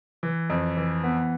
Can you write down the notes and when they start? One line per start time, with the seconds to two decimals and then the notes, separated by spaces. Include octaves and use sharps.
0.23 E3
0.50 F2
0.77 E3
1.04 B3